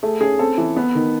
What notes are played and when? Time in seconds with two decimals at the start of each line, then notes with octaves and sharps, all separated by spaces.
0.03 A3 G#4
0.21 C#4 G#4
0.39 C4 A4
0.58 E3
0.76 B3
0.95 D#3